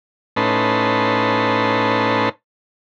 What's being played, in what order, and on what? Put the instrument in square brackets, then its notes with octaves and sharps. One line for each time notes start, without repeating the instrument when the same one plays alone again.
[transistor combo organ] A2 C#4 D#4 B4 A5 C6